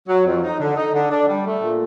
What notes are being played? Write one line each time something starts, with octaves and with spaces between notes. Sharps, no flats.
F#3
F2
D#4
D3
D#4
D3
D4
G3
A3
A#2